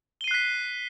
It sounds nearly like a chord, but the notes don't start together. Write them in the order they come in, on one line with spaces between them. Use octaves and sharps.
G7 D#7 C7 F#6 B6